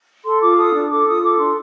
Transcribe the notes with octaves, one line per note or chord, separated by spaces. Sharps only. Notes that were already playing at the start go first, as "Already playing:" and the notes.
A4 C6
F4 D6
A4 D#6
D4
A4 D6
F4 D#6
A4 D6
D4 C6